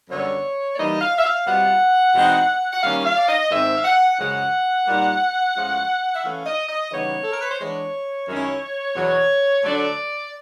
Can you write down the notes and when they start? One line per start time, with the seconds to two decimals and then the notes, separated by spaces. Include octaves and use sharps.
0.09 F#2 D3 G3 B3 C#5
0.74 D5
0.78 E3 G3 A#3 D#4 D#5
1.01 F5
1.18 E5
1.24 F5
1.46 B2 G3 C4 F4 F#5
2.14 E2 B2 G#3 C4 D#4
2.73 F#5
2.82 D#3 G3 A#3 C#4 F5
3.05 F5
3.16 D5
3.28 D#5
3.50 G#2 D#3 G#3 C4 E5
3.77 F5
3.84 F#5
4.18 F#2 C#3 F3 G#3 F#5
4.87 A#2 G3 A#3 D#4
5.55 A2 F3 G#3 C#4 F4
6.15 E5
6.23 E3 A3 C#4 F5
6.46 D#5
6.69 D#5
6.91 C#3 E3 G3 B3 D#4 C#5
7.24 A4
7.32 A#4
7.41 B4
7.50 C5
7.59 E3 G#3 B3 D4 C#5
8.27 F#2 D#3 G#3 C#4 E4
8.95 E2 B2 F#3 C#5
9.64 D3 F#3 A3 D4 D5